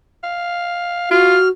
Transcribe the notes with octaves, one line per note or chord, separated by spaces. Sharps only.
F5
F4 F#4 F6